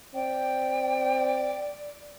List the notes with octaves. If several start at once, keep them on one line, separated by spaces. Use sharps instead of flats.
C4 D5 G5